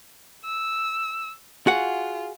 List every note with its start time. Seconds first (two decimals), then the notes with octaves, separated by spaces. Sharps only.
0.45 E6
1.67 F4 F#4 G#4 F#5